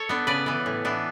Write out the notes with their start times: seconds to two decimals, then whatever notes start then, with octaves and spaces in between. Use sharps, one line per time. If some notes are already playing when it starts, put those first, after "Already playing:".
Already playing: A4 C#5
0.09 B3 D4
0.27 C#3 B4 D5
0.46 E3 B3
0.66 A2
0.85 E3 B3 D4